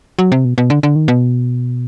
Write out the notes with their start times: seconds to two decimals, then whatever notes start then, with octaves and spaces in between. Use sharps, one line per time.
0.19 F#3
0.32 C3
0.45 B2
0.58 B2
0.70 D3
0.83 D3
0.96 D#3
1.08 B2